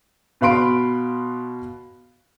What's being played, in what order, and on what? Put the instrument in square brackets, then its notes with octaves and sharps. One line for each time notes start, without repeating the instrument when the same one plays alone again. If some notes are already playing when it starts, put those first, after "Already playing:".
[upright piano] B2 B4 F5 B5 C6 D7